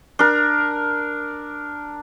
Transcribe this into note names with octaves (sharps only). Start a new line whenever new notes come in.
D4 A#4